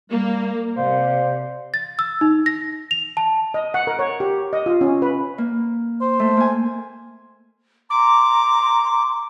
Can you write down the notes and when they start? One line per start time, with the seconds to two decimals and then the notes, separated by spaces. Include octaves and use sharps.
0.10 G3 A#3
0.76 C3 C5 D5 F5
1.74 A6
1.99 E6
2.21 D#4
2.46 A#6
2.91 F7
3.17 A5
3.54 D#5
3.74 F#5
3.87 A#4
3.99 C#5
4.20 G4
4.53 D#5
4.66 F4
4.81 C#4
5.02 B4
5.38 A#3
6.01 C5
6.19 A3
6.37 A#3 G#5
7.90 A#5 C6 D6